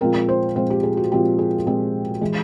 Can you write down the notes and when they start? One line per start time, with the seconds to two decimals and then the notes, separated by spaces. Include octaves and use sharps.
0.01 A#2 F3 G#3 C4 A#4
0.29 C5
0.56 A#2 F3 G#3 C4 C5
0.70 G4
0.83 G#4
0.97 F#4
1.11 A#2 F3 G#3 C4 G4
1.39 G#4
1.67 A#2 F3 G#3 C4 G#4
2.21 E3 G#3